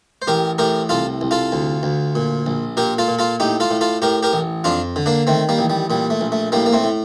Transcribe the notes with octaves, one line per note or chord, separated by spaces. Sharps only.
C5
A1 G4 A#4
A2 G4 A#4
C2 F4 A4
C2
F4 A4
D2
D2
A#2
A#1
A#2 G4 A#4
F4 A4
A#2
F4 A4
A2 D#4 G4
F4 A4
A2
F4 A4
A2 G4 A#4
G4 A#4
A1
F2 D4 F4
D3
A#3 D4
D#3 A3 C4
G3 A#3
A1
G3
A#2 G3
A3
A#1
A3
A2 G3 A#3
A#3
A3 C4
A2